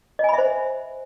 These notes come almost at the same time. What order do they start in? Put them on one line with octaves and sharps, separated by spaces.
D#5 G#5 B5 E5 C5